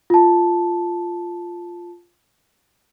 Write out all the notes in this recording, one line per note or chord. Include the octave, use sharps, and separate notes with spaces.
F4 A5